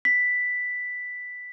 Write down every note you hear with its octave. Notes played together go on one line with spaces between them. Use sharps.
B6